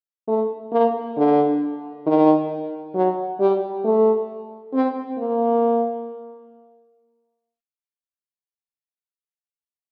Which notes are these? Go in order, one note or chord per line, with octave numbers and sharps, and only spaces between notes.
A3
A#3
D3
D#3
F#3
G3
A3
C4
A#3